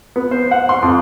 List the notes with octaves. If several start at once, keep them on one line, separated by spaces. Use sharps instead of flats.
B3
C5
F#5
C6
F2